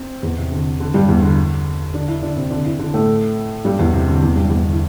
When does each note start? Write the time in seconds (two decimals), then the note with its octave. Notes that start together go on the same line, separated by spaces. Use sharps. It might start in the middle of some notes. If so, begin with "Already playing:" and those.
Already playing: C4
0.23 E2 E3
0.38 C3
0.52 D3
0.80 D3
0.94 G2 G3
1.08 E2 E3
1.22 D3
1.94 D3 D4
2.08 E3 E4
2.22 D3 D4
2.36 C3 C4
2.51 D3 D4
2.65 E3 E4
2.79 D3 D4
2.94 A2 A3
3.64 G2 G3
3.79 E2 E3
3.93 C3
4.08 D3
4.22 E2 E3
4.36 G2 G3
4.50 E2 E3
4.65 D3
4.73 E3